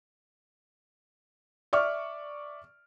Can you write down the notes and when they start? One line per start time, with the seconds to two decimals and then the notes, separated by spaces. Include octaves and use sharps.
1.73 D5 E5 C#6 D6 F6